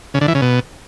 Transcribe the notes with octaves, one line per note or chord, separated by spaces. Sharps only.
C#3
D3
E3
C#3
B2